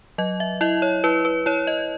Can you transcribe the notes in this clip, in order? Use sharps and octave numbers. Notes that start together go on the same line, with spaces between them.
F#3 D#5
E5
E4 D#5
C#5
E4 B4
B4
E4 C#5
D#5